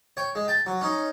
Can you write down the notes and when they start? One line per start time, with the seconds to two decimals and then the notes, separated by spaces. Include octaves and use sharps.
0.17 C#5 G5
0.35 G#3
0.48 G5 A5
0.66 F#3
0.81 C#4 D#4